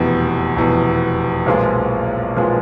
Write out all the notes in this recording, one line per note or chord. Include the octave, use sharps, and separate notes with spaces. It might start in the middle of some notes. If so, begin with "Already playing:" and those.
Already playing: F1 E2 B2
F1 E2 B2
B1 A#2 F3 G#3 B3
B1 A#2 F3 G#3 B3